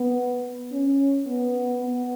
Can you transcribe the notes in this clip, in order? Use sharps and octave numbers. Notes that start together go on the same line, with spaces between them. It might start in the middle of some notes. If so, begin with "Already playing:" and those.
Already playing: B3
C#4
B3
B3